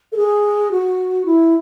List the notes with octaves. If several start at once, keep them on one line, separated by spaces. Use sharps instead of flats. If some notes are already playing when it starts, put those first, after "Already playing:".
A4
G#4
F#4
E4